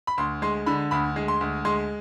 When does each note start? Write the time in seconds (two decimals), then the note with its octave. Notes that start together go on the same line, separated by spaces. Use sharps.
0.07 B5
0.17 D2 C6
0.42 G#3 C6
0.66 D3 B5
0.91 D2 B5
1.16 G#3
1.28 C6
1.41 D2
1.65 G#3 C6